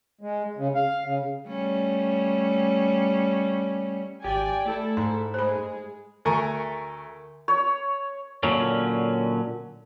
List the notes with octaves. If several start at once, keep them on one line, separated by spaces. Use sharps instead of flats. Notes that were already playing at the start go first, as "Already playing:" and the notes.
G#3
C#3
F5
C#3
G3 A3 C#4
G#1 G4 D5 G5 G#5
A3 E4 A4 D5
G#2 C6
G#3 G#4 C5 B5
D2 A3 A#4 G#5 C#6
C#5
A#2 D3 F#3 C#4